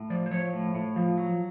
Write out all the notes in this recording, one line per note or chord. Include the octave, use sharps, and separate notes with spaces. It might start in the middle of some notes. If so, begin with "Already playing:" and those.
Already playing: A2
F3 D5
C5
F3 C#5
A2
A2
F3
F#3